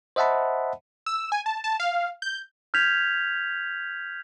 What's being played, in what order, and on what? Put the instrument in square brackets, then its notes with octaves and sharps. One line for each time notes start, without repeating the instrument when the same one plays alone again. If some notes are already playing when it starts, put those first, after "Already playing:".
[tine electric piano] C5 D#5 E5 F#5 A5 B5
[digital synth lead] E6
G#5
A5
A5
F5
G6
[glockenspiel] F6 G6 G#6 B6 F7